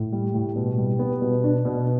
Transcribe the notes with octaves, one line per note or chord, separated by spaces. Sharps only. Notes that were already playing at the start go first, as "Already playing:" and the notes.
Already playing: A2
G3
A2
B2
G3
B3
B2
D4
B2